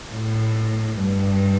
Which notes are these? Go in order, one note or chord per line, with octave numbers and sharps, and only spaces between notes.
A2
G2